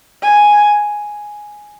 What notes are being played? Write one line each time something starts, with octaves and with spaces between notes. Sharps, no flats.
G#5